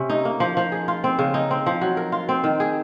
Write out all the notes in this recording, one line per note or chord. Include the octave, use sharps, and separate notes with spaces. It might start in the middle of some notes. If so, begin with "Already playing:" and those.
Already playing: C3 C#4
D#4
A#3
F3
F3
G#4
F4
C4
C#3
D#4
C4
F3
F#3
A#4
F4
C4
D#3
G#4